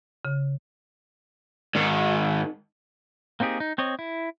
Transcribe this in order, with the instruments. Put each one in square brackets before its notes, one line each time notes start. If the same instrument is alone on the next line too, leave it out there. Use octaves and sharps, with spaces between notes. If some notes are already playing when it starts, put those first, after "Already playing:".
[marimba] C#3
[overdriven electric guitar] G#2 D#3
[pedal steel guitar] A#3 C4 D#4 G4 G#4
D#4
C4 C#5 D#5
E4